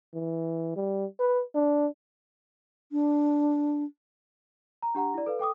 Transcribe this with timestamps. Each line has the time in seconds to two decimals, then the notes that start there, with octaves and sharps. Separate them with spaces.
0.14 E3
0.76 G3
1.20 B4
1.55 D4
2.92 D4
4.82 A#5
4.95 D4 G4 F#5 A#5
5.14 E4 D5
5.26 A4 B4 F5
5.39 A4 G5 D6 D#6